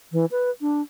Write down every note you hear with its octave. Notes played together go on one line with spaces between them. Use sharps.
E3
B4
D4